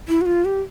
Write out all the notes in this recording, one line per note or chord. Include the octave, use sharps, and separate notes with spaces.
E4
F#4
F4
G4